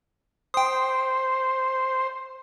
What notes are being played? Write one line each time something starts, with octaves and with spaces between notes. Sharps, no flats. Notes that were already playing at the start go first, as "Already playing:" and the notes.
C5 G5 D#6